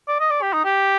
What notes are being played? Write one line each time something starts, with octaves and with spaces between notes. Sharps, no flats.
D5
D#5
D5
G4
D#4
G4